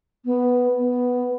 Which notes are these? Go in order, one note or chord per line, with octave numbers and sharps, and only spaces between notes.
B3
B3